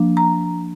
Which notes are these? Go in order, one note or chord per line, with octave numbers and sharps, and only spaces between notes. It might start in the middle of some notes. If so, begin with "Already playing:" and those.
Already playing: F3 A#3 D4
A#5